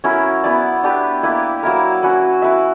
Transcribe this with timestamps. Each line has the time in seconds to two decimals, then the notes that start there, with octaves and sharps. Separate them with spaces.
0.04 F#3 C#4 E4 A#4
0.44 B3 E4 B4 D5
0.83 D4 G4 B4
1.23 A#3 E4 B4
1.63 F#3 A#3 E4 A#4
2.03 C#4 F#4 B4
2.42 E4 B4 E5